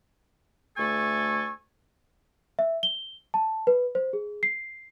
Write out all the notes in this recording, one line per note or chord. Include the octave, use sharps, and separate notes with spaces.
D2 A3 A4 G#5 C#6
E5
G7
A5
B4
C5
G#4
C7